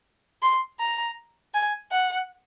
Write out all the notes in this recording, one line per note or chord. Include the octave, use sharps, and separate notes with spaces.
C6
A#5
G#5
F#5